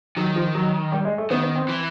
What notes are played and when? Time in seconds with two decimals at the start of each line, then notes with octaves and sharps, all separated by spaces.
0.17 D#3 F#3
0.36 F3
0.55 F#3
0.92 G3
1.05 G#3
1.18 A3
1.30 D#3 B3
1.43 B3
1.56 C4
1.69 E3